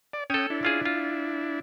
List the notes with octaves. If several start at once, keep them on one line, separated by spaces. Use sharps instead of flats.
D5
C#4 A4 C#5 G5 D#6
D4 E4
C#4 F4 G#4
F4